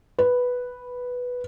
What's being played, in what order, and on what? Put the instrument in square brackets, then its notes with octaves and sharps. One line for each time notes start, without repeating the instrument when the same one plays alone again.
[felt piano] B4